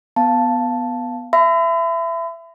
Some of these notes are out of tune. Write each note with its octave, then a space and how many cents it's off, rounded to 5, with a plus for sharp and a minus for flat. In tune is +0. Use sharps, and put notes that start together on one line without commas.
B3 +0 F5 +0 A5 +0
E5 +20 B5 +40